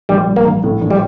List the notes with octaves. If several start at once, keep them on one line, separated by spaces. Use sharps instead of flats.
A#1 G3
G3
A#3
A#1
A2
A#1
G3